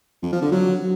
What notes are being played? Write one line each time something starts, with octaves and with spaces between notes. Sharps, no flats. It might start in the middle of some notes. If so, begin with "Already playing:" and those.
F2
F3
D3
F#3